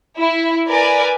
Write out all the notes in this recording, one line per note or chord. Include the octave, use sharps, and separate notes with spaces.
E4
A#4 B4 D5 G#5